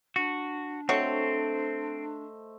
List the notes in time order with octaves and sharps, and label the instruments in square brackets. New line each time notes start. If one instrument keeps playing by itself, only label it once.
[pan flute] D4 [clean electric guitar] F#4
[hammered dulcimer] A3 C5 D#5 [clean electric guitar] C4 [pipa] F#4 C#5